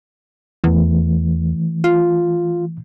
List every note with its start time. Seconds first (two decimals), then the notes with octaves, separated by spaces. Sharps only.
0.64 E2 E3 A3
1.84 F4